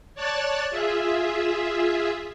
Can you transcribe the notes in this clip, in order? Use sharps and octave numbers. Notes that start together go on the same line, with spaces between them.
C#5 D5 A5 F#6 A6
F4 G#4 E5